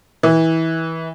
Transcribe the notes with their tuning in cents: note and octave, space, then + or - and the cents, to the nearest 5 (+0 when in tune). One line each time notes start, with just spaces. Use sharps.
E3 -20